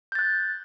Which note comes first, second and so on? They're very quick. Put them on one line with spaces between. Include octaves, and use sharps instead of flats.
G6 A6 F#6